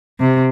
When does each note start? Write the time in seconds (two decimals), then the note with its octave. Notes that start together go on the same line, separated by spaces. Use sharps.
0.20 C3